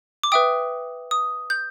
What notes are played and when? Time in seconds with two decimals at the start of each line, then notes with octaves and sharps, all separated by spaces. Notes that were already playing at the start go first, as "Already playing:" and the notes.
0.24 D6
0.32 B4 E5 G5 D#6
1.11 D#6
1.50 G6